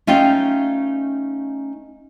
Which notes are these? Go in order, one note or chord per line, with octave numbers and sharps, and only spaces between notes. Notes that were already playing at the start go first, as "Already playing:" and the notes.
A3 C#4 D#4 F4 F5 G5